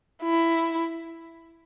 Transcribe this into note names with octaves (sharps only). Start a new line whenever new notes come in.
E4